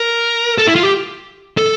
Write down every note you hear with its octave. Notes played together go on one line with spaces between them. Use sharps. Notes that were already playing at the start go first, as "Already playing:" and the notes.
Already playing: A#4
A4
E4
F4
G4
A4